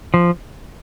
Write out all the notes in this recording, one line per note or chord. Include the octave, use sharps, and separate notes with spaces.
F3